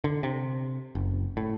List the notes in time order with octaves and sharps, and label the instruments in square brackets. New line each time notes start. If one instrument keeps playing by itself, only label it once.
[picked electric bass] D3
C3
F#1
A2